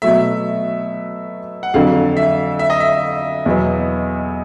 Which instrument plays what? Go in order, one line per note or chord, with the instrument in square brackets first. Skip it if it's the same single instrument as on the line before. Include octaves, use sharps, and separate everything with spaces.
[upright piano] B2 F#3 A3 [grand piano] E5
[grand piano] F#5
[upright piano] F2 D3 F#3 [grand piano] F5
[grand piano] E5
E5
D#5
E5
[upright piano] E2 B2 F#3 B3